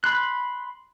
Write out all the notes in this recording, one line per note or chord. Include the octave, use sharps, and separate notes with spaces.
B5 C6 F#6